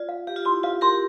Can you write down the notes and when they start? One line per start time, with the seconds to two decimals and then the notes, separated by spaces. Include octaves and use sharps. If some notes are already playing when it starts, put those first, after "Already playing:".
Already playing: F4 D5
0.09 F5
0.27 G4 F5
0.36 F4
0.45 E4 C6
0.63 F4 F5
0.81 G4 A#4 C6